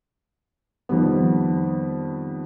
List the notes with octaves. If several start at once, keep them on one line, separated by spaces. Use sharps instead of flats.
F2 D#3 G3 B3